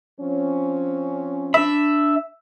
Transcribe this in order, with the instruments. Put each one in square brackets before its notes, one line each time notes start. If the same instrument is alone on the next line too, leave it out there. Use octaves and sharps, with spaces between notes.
[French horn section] F3 C4 C#4
[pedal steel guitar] D4 B5 [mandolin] E5